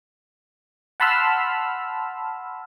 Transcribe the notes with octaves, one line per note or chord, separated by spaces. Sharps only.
F#5 A5 B5 C6 E6 F6